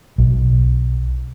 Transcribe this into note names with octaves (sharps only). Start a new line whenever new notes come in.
B1